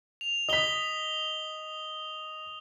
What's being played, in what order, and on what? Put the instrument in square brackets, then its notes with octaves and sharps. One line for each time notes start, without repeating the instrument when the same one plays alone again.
[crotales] F7
[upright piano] D#5 B6 [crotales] D#6 G7